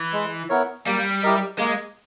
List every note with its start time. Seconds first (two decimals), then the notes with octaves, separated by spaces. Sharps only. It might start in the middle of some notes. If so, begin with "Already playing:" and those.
Already playing: E3
0.13 G#3
0.50 B3 E4 A#4 C#5
0.86 G3 A#3
1.23 E4 G4 A#4 D#5
1.59 G#3 A#3